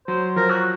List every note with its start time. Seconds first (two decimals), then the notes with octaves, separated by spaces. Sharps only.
0.08 F#3 C5
0.36 F3 A#4
0.50 F#4